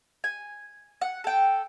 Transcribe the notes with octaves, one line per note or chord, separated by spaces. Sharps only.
G#5
F#5
A4 G5